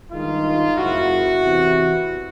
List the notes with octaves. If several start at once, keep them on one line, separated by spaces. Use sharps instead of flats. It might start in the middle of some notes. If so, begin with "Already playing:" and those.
G2 D#3 G#3 D#4 F4
F#1 F#2 C#3 E4 F#4
E2 C3 E3